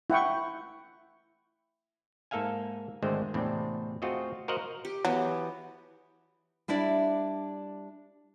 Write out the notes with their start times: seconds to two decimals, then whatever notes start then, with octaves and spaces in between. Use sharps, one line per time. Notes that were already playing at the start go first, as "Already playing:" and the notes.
0.10 E4 F#5 G5 C#6
2.31 G#2 A#3 A4 E5 F5 G#5
3.02 G#1 D3 G#3 A3 C4 C5
3.34 E2 A2 C3 C4 D4
4.02 A3 C4 F4 F#4 G#4 D#5
4.48 F#4 A#4 C5 D#5 F5 F#5
4.85 G4
5.05 E3 F#3 B3 G4
6.68 G3 D4 E4 D5